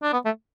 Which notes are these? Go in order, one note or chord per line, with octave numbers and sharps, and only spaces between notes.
D4
B3
A3